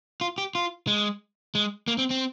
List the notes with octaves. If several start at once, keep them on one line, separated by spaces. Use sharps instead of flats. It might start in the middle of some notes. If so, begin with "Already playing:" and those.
F4
G4
F4
G#3
G#3
A#3
C4
C4